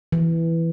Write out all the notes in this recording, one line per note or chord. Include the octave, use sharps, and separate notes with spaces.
E3